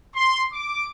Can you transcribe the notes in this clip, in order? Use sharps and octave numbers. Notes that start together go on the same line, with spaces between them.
C6
D6